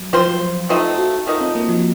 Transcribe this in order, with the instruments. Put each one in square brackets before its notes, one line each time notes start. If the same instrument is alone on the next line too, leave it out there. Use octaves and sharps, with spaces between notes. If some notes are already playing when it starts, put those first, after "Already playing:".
Already playing: [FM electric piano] F#3
[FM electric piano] F3 [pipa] C4 F4 C5
[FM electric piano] F#3
F3
[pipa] F3 A3 C4 D#4 [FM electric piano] F4
[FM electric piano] F#4
[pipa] D#3 F#3 A3 D#4 [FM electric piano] F4
[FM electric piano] C4
A#3
F3